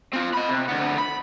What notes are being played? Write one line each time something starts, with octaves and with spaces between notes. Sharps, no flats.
C4 F4
D#5 B5
C3
D2 B3
B5